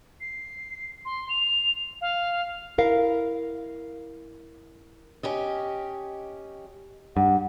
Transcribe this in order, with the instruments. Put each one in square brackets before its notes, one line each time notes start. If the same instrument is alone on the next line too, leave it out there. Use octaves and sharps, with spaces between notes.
[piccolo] C7
C6
F7
F5
[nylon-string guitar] E4 A#4 F5
[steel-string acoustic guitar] C#4 G4 D#5
[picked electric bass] G2 [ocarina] F#5